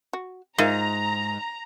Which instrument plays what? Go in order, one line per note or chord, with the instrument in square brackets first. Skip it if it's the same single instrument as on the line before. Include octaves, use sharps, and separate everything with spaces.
[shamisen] F#4
[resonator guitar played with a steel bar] G#2 [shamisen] F4 A#4 E5 [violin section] A#5